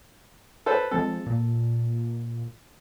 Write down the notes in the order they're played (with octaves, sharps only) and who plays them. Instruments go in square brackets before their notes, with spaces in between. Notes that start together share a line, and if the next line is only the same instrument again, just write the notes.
[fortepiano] A4 B4 C5
[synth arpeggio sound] F3 G#3 C4 [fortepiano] A4
[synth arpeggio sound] A#2